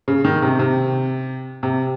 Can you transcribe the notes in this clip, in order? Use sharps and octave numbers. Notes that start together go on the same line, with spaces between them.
C#3
D#3
C3
C3
C3